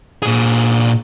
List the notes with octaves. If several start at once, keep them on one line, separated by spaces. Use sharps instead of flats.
A#2 G#4